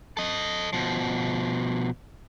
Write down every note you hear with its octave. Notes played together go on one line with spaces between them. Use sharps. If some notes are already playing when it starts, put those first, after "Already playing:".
A4 D#5
B2 F3